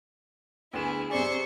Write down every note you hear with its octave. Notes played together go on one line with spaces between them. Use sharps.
D2 B3 E4 G#4 E7
C3 G#4 C5 D5 C#6